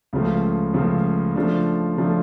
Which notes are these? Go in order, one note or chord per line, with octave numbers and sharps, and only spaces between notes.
C#2 C#3 F3 A3
C#2 C#3 F3 A3
C#3 F3 A3 D4
C#3 F3 A3 D4